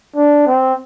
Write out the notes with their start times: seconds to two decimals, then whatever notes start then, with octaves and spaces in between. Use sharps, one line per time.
0.16 D4
0.47 C4